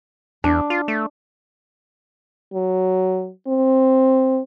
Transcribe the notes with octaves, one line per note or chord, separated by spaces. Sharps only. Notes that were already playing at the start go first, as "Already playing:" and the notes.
E2 D4
F4
A3
F#3
C4